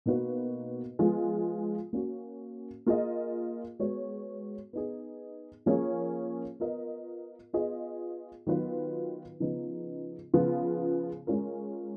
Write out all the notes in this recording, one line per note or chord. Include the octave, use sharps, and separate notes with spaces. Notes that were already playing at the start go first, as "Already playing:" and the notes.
B2 A#3 D#4 F#4 B4
F3 G#3 B3 F4
A#3 C#4 F#4
A#3 F4 G#4 D#5
G#3 B3 F#4 C#5
B3 D#4 G#4
F3 A#3 C#4 G#4 C#5
B3 F4 A#4 D#5
B3 F4 G#4 D#5
D#3 F#3 B3 F4 B4
C#3 F3 B3 D#4
C#3 F3 B3 F4
G#3 C#4 F4 A#4